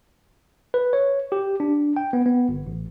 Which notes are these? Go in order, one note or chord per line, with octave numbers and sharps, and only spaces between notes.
B4
C#5
G4
D4
G5
B3
B3
G1
A1